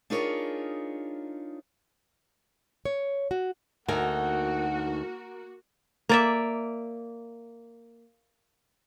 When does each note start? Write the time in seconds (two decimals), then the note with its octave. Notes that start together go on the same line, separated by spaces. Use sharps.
0.10 D4 D#4 F4 G#4 A#4 C#5
2.85 C#5
3.31 F#4
3.88 D2 A#3 D#4 F#4 A#4 F#5 G#5
6.09 A#3 D5 E5